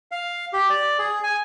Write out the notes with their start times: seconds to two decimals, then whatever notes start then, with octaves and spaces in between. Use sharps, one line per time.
0.11 F5
0.53 G4
0.70 D5
0.99 G#4
1.23 G#5